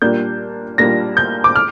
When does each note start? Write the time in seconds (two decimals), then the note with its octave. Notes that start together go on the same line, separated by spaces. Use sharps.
0.02 A#2 G3 A#3 D4 G6
0.78 A#2 G3 A#3 D4 A#6
1.17 G6
1.44 D6
1.56 F6